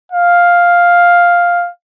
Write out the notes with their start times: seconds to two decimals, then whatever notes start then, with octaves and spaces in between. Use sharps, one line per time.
0.12 F5